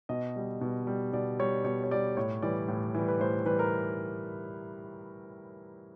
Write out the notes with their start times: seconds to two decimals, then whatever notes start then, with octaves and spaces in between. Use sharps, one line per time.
0.09 B2 D#5
0.36 G3
0.61 B2
0.87 G3
1.13 B2 D5
1.39 G3 C#5
1.64 B2 C#5
1.84 C#5
1.91 G3 D5
2.17 A2 C#5
2.42 E3 G3 D5
2.68 A2
2.95 E3 G3
3.08 B4
3.20 A2 C5
3.46 E3 G3 B4
3.59 A#4